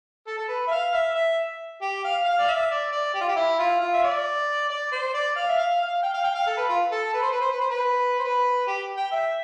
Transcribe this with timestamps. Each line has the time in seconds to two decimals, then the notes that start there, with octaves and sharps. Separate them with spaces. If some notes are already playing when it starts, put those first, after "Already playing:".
0.27 A4
0.38 A4
0.48 B4
0.67 E5
0.71 F5
0.93 E5
1.15 E5
1.82 G4
2.04 F5
2.26 F5
2.39 D5
2.48 E5
2.71 D5
2.92 D5
3.15 G4
3.21 F4
3.29 G4
3.36 E4
3.59 F4
3.81 F4
3.94 E5
4.04 D5
4.70 D5
4.92 C5
5.14 D5
5.36 F5
5.49 E5
5.58 F5
5.81 F5
6.03 G5
6.14 F5
6.24 G5
6.35 F5
6.46 A4
6.57 B4
6.69 F4
6.91 A4
7.13 B4
7.22 C5
7.32 B4
7.41 C5
7.51 B4
7.60 C5
7.70 B4
8.19 C5
8.24 B4
8.67 G4
8.97 G5
9.11 E5